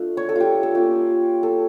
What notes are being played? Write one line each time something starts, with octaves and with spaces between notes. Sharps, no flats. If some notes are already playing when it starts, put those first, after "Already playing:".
Already playing: A3 D4 F4
C#5
A4
F4 G4
A4
A#3 C#4 F4 G4
A4